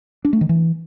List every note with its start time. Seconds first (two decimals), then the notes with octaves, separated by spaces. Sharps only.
0.25 D4
0.33 A3
0.41 D#3
0.49 E3